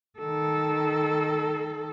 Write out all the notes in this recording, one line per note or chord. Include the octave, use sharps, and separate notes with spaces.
D#3 A4